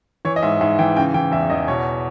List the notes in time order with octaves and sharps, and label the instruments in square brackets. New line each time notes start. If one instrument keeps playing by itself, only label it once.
[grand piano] E3 C#5
D#5
G#2 E5
G#2 E5
E3 G5
C#3 G5
E3 G5
E2 E5
E2 D#5
B2 C#5